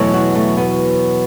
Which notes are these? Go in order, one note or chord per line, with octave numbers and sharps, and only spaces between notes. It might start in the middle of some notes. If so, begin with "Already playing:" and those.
Already playing: E2 B2 F#3 A3
F#4
A3
B3